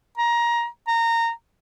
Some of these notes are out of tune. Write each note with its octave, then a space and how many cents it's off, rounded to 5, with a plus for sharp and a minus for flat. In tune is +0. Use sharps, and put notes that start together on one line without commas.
A#5 +20
A#5 -20